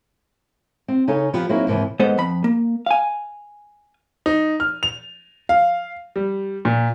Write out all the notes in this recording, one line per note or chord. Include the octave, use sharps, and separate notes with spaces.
C4
C#3 D#4 A4 C#5 G#5
F3 B3 F4 G4
F#3 A#3 C4 D#4 E4 G#4
D#2 G#2 C3 E3
G#2 B3 A4 C5 D#5
F2 B5
A#3
F5 G#5
D#4
F6
F7
F5
G3
A#2